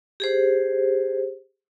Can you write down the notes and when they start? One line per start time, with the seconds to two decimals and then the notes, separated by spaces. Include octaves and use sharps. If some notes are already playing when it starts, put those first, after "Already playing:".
0.20 G4 G#4 C5